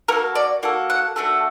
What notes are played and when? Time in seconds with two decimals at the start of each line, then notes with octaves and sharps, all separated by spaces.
0.08 A#3 F#4 A4 A#4
0.35 D5
0.63 A#3 F#4 A4
0.90 F#5
1.16 A3 D4 F#4 A4